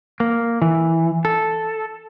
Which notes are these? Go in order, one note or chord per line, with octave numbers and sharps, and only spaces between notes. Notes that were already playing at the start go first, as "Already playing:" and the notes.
A#3
E3
A4